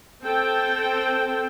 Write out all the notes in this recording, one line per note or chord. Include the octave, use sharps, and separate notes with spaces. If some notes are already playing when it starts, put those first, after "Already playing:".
C4 A4 G5